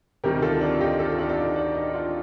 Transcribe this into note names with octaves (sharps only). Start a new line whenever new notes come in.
D2 C3 D#3 G3 G4 A#4
F4 A4
D4 F4
D#4 G4
F4 A4
D4 F4
D4
D#4
D4
D#4
D4 F4